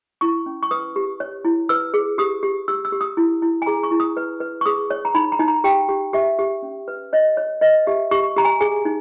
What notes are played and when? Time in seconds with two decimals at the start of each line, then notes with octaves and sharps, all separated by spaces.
0.21 E4 C#6
0.46 C#4
0.63 C#6
0.71 B4 D#6
0.96 G4
1.20 C#5
1.45 E4
1.69 B4 E6
1.94 G#4
2.18 G4 D#6
2.43 G4
2.68 G4 E6
2.85 E6
2.92 G4
3.01 D#6
3.17 E4
3.42 E4
3.62 G#5
3.66 G#4 A#5
3.83 C#6
3.91 E4
4.00 D#6
4.17 B4
4.40 B4
4.61 C#6
4.66 G#4 D#6
4.90 C#5
5.05 A#5
5.15 D#4 B5
5.32 A#5
5.39 D#4
5.48 A#5
5.64 G4 G5
5.89 G4
6.13 G4 E5
6.39 G4
6.63 C#4
6.88 B4
7.13 C#5 D#5
7.37 C#5
7.61 B4 D#5
7.87 G4 E5
8.11 G4 C#6
8.37 G4 A#5
8.45 G#5
8.61 G#4 G#5
8.85 D#4